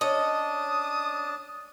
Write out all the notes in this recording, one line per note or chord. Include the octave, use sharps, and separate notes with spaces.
C#4 D4 D#5 A5 D#6